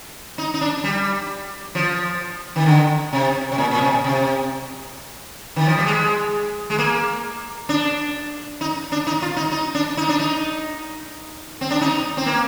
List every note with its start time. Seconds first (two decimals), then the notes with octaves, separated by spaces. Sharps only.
0.38 D#4
0.54 D#4
0.61 D4
0.84 G3
1.75 F3
2.56 D#3
2.66 D3
3.13 C3
3.52 C3
3.58 A#2
3.71 A#2
3.81 C3
4.04 C3
5.56 D#3
5.66 F3
5.77 G3
5.86 G#3
6.70 G#3
6.78 A#3
7.69 D4
8.61 D#4
8.92 D4
9.07 D#4
9.22 F4
9.36 D#4
9.52 D#4
9.75 D4
9.97 D#4
10.09 D4
10.19 D#4
11.61 C4
11.71 D4
11.81 D#4
12.17 C4
12.26 A#3